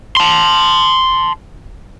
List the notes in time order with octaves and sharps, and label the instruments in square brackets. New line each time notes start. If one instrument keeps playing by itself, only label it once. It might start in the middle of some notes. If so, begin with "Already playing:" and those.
[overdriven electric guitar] A5 C6